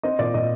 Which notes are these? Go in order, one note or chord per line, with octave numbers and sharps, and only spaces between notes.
C4 D#5
A#2 D5
A#2 D#5